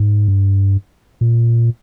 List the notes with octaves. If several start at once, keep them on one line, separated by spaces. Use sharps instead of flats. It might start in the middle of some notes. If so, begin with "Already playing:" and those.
Already playing: G#2
G2
A#2